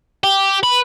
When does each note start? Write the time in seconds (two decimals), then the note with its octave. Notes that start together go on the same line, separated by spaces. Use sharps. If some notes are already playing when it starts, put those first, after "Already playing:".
0.24 G4
0.63 B4